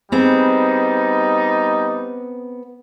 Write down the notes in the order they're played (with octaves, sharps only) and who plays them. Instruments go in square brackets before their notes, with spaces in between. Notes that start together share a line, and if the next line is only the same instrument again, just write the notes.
[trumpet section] G3 D#4 [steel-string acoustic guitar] B3 C4 G#4